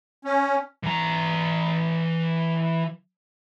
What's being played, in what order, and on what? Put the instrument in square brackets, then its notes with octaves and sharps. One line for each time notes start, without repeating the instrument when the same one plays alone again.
[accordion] C#4
[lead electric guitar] E3 A#5